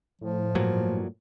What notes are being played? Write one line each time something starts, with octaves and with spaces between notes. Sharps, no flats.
A2 F3
G2 A#2 F#3